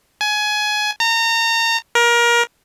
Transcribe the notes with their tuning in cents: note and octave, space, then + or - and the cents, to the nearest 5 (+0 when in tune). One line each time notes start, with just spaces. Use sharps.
G#5 +20
A#5 -30
A#4 +25